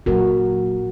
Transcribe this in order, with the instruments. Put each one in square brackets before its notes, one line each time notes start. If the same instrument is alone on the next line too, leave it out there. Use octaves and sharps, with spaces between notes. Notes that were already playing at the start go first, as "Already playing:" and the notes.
[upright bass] A#2 F#3 [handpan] F#4 A#4